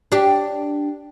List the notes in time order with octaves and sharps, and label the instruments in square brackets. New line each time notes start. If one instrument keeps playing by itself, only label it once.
[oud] D4 G4